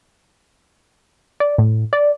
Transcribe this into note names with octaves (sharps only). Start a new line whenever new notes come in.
D5
A2
D5